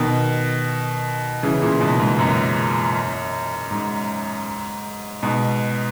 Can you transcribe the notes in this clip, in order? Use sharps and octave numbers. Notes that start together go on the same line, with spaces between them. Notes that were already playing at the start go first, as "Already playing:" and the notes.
Already playing: B2 D#3
C#3 E3
A#2 C#3
G#2 B2
G#2
F#2
G#2
G#2 B2